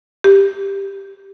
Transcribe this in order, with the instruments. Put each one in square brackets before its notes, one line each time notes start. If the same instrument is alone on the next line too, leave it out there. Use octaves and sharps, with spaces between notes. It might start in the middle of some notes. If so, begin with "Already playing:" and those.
[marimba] G4